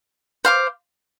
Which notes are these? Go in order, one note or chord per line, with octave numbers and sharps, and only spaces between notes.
C5 F5 D6